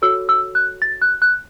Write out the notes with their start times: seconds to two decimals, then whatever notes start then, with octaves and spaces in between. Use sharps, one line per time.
0.02 F#4 A4 C#5 E6
0.29 E6
0.55 F#6
0.82 A6
1.02 F#6
1.22 F#6